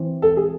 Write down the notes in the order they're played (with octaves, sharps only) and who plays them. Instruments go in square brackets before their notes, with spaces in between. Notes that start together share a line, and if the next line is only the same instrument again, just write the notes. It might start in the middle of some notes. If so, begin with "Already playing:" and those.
Already playing: [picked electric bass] E3 C4
[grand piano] A4
G#4